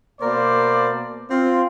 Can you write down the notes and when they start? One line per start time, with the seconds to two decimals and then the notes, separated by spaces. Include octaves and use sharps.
0.20 B2 A#3 A#4 C5 D5
1.31 C4 F4